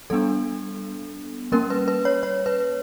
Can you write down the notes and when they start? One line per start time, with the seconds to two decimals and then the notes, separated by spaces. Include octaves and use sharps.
0.10 G3 B3 D4 A4
1.52 G3 A#3 C#4 A#4
1.70 B4
1.88 B4
2.05 C#5
2.23 C#5
2.46 B4